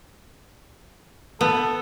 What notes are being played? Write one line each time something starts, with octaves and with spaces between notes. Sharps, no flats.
B3 A4